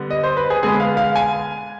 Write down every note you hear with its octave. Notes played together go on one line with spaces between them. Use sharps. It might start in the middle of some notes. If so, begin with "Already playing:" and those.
Already playing: D3 G3 B3
D#5
C5
B4
G#4
D3 G#3 B3 G#4
F5
F5
G#5